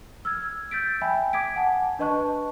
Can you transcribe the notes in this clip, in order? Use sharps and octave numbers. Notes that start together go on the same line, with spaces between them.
E6 F6 G#6
E6 G6 A6 B6 D7
E5 G5 G#5 B5
D6 D#6 G#6 B6 D7
F#5 G#5 A5
D4 B4 D#5 A5 C#6 F#6